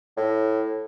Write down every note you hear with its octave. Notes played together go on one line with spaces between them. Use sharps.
A2